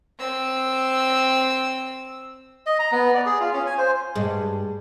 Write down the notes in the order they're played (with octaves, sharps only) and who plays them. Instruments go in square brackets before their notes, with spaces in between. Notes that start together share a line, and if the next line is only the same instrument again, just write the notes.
[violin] C4 E6
[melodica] D#5
A#5
B3
D5
G#4
F4
C#4
G#5
C5
[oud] G2 G#3